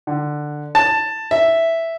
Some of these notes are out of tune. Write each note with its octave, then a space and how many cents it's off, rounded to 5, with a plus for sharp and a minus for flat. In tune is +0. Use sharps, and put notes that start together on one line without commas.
D3 +15
A5 +10
E5 +0